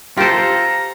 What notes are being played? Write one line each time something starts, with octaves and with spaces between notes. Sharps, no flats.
F4 G4 A4 C5 A#5